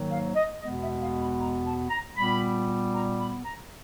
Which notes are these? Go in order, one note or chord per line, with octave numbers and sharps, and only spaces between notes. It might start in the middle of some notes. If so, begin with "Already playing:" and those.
Already playing: G#2 D#3 F#3 A#3
F5
D#5
E2 B2 G#3 B3 D#5
E5
F5
B5
A#5
A5
A#5
A#2 G3 B3 B5
A#5
B5
A#5